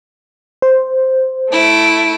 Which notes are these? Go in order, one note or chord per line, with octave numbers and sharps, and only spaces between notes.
C5
A3 E4 D7